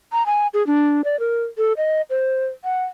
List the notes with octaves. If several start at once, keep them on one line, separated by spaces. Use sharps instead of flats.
A#5
G#5
G#4
D4
D5
A#4
A4
D#5
C5
F#5